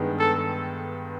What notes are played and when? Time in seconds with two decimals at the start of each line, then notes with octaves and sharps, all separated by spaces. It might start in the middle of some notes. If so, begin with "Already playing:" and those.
Already playing: G2 D#3 G#3 B3
0.19 A4